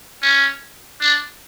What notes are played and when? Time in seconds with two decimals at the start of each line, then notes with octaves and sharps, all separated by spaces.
0.22 C#4
1.01 D4